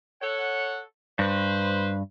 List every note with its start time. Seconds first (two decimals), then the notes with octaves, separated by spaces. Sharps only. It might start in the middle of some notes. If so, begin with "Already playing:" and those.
0.22 A4 C#5 F#5
1.19 G2 B4 C5